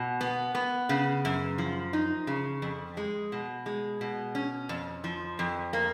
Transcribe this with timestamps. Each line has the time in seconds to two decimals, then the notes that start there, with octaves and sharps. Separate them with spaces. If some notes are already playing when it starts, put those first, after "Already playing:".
Already playing: B2
0.21 B3
0.55 B3
0.89 C#3
1.25 F#2
1.58 F3
1.93 D#4
2.27 C#3
2.62 F2
2.97 G#3
3.32 B2
3.66 G#3
4.01 B2
4.35 C#4
4.69 F2
5.04 F3
5.39 F2
5.73 A#3